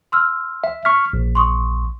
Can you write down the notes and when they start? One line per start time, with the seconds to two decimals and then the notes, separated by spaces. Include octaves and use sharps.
0.12 C6 E6 F6
0.64 E5
0.85 C#6 F6 B6
1.13 A#1
1.35 C6 C#6 D#6